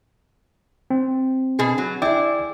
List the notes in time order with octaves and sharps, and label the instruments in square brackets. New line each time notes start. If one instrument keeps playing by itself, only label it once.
[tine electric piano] C4
[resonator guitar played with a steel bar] B2 G#4
F#3
[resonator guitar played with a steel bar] E4 G#4 [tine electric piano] D5 G5 D6